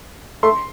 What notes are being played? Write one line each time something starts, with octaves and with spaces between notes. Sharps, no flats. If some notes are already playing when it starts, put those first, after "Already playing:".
A3 C6